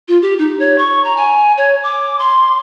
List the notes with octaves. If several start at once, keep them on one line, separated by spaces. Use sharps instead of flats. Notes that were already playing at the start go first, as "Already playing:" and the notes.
F4
G4
D#4
C#5
C#6
A#5
G#5
C#5
D6
C6